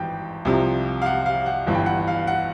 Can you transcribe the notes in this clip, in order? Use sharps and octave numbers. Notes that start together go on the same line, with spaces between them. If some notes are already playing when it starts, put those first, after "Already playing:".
Already playing: G#1 G2 E3 G5
C2 C3 F3
F5
F#5
F5
F#5
G1 G2 E3
G5
F#5
F5
F#5